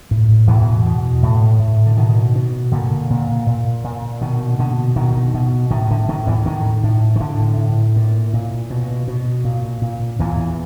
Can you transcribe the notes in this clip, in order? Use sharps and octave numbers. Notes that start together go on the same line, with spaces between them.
A2
E2 B2 E3
B2
A2
A2
D3
B2 D#3
B2
A#2 D3
A#2
A#2
A#2
B2 D#3
B2 D3
B2 D#3
B2
A2 D#3
D3
A2 D#3
E2 E3
A2 D#3
A2
D#3
A2 D3
A2
A#2
A#2
B2
B2
A#2
A#2
E2 A#2 E3